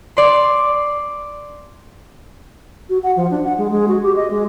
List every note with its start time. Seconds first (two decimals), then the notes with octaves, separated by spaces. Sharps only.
0.17 D5 C6
2.90 F#4
3.03 F#5
3.16 F3
3.31 D4
3.44 F#5
3.58 G#3
3.71 G#3
3.88 F#4
4.03 G4
4.16 D#5
4.30 G#3